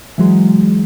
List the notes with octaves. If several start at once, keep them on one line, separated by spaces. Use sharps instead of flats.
E3 F#3 G#3